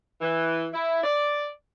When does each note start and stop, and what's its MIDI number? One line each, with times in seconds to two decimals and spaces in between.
0.21 0.66 52
0.73 1.03 64
1.03 1.49 74